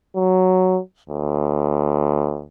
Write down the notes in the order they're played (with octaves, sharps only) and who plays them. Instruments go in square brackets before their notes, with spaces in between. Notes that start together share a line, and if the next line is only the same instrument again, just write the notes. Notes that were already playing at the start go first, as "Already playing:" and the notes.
[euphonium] F#3
D2